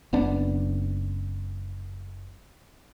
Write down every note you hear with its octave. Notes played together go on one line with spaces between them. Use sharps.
F#1 B3 D4